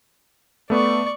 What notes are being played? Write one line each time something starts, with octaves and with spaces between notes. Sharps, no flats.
A3 B3 D5 C#6